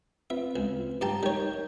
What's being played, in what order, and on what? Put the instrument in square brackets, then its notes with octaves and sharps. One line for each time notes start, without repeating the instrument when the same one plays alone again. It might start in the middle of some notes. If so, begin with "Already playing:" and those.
[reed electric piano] C4 F4 B4 [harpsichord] E5
[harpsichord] C#2
[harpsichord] G2 G4 A5 [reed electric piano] A#5
[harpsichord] G3 C#5 [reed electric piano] D#4 A#4 G6